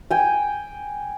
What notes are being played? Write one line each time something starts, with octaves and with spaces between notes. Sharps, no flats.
G5 G#5